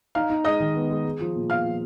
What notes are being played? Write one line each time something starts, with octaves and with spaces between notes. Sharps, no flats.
D#4 F5 F6
D#4
G#3 D#5 D#6
D#3
B3
G#3
G#3
F3
A#2
B3 F5 F6
F3